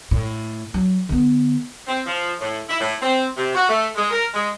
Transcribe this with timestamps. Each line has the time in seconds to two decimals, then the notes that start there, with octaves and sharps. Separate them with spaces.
0.11 A2
0.74 F#3
1.09 D3 B3
1.87 C4
2.05 F3
2.40 A2
2.67 E4
2.80 A2
3.01 C4
3.36 C3
3.54 F#4
3.68 A3
3.95 G#3
4.10 A#4
4.33 G#3